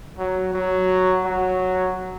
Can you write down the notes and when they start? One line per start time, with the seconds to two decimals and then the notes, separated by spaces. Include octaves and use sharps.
0.18 F#3
0.54 F#3
1.24 F#3